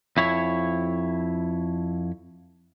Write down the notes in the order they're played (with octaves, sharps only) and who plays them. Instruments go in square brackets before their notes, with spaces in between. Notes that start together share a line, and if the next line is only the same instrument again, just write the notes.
[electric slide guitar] F2 E4 C#5